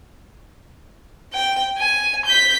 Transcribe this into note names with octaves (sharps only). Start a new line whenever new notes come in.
G5
G#5
G6 B6